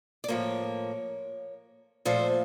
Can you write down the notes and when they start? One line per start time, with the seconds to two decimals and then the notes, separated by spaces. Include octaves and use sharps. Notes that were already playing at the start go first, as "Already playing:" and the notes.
0.24 D5
0.28 A2 F3 A#3 C#5
2.05 A#2 F3 A3 C5